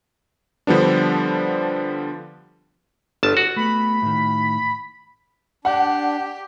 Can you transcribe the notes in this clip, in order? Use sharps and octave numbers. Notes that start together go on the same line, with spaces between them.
D3 F3 G3 B3 D4
G1 A5
F#4
A3 B3 B5
A2 D#3
D4 G4 F#5